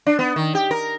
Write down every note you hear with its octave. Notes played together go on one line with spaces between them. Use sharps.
D4
B3
D#3
G4
A#4